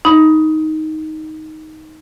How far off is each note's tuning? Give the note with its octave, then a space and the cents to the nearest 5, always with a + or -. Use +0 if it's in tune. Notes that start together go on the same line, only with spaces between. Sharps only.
D#4 +5 B5 +0